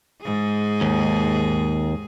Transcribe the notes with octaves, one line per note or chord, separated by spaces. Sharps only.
G#2 G#4
D#2